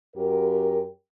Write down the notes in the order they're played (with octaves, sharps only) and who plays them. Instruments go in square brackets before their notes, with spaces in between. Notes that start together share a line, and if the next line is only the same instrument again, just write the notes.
[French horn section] F#2 G4 A#4